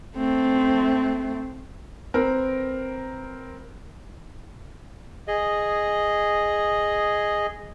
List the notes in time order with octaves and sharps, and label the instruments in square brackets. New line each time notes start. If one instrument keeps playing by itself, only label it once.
[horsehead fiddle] A3 C4
[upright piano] C4 A#4 B4
[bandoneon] G#4 D#5